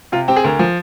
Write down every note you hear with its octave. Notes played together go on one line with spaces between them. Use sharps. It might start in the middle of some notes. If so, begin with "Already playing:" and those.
C3 F4
C4 G4
G#4
D2 A#4
F3